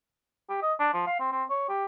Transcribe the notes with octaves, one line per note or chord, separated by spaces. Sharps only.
G4
D#5
D4
F3
F5
C4
C4
C#5
G4